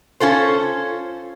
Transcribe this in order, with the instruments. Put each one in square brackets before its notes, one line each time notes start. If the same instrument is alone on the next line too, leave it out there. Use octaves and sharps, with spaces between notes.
[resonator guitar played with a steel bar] C#4 F4 A4 C5